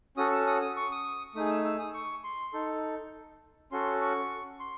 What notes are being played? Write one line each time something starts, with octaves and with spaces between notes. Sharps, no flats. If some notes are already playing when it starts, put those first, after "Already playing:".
C#4 F#4 A4 D#6
E6
D#6
D#6
C#6
D#6
A3 D#4 G#4 D#6
D#6
E6
E6
D#6
C#6
C6
D#4 A4
C#4 F#4 A4 C6
C#6
C6